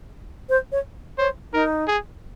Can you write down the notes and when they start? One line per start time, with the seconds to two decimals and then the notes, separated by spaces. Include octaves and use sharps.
0.49 C5
0.72 C#5
1.18 C5 C#5
1.53 D#4 A#4
1.87 G#4